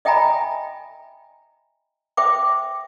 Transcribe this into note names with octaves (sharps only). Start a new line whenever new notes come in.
D#5 E5 G5 G#5 A#5 B5
C5 E5 G5 D6